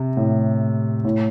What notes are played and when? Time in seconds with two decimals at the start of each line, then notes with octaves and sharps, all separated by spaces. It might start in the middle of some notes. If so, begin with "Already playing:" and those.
Already playing: C3
0.17 A2
1.05 A2